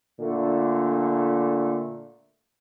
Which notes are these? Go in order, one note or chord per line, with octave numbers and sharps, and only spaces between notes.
A#2 D3 A3